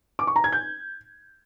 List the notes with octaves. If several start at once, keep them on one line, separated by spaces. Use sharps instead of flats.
D6
C#6
A#5
G#6
G6